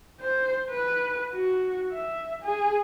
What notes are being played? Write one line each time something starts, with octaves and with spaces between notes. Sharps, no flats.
C5
B4
F#4
E5
G#4